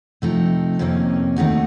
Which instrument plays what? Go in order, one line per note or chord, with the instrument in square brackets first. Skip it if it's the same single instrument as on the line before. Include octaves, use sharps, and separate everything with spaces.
[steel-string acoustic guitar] C3 F3 A3 D#4
F2 C3 D#3 A#3 C#4
D#2 D#3 A3 D#4 F#4